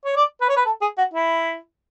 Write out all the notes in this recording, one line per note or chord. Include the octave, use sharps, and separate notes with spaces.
C#5
D5
B4
C#5
B4
A4
G#4
F#4
E4